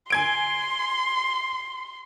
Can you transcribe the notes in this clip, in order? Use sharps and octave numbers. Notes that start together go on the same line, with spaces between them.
G#5 C6 G#6 D7